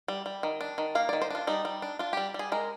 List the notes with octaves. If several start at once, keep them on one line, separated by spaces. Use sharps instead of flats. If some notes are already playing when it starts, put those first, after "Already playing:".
G3
G3
D#3
D4
D#3
A#3 F5
D#3 D5
C5
D4 F4
G3 D#4
G3
D4
D4 F4
G3 G4
G3 G#4
G#3 A#4